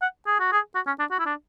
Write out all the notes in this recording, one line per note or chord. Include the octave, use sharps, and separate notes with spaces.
F#5
G#4
F#4
G#4
F#4
C#4
D4
F#4
E4
D4